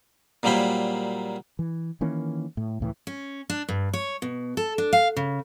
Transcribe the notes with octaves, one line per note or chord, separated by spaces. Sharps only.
A#2 F#3 G3 A#3 C5 B5
E3
D#3 E3 A#3 C#4
A2
C#2 A2 E3
C#4
D4
G2
C#5
B2
A4
D4
F5
C#3